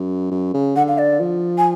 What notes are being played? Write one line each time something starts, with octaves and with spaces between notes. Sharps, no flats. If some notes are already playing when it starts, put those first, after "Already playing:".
Already playing: F#2
F#2
C#3
D3 F#5
F5
D5
F3
G#5